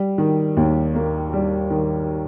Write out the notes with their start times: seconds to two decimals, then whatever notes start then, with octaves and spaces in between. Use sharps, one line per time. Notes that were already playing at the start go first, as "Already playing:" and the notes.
Already playing: G3
0.18 D#3
0.57 D#2
0.95 A#3
1.33 G3
1.70 D#3